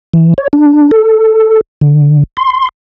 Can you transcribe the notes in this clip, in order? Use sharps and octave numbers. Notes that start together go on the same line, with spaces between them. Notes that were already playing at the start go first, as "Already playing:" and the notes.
E3
C#5
D4
A4
D3
C6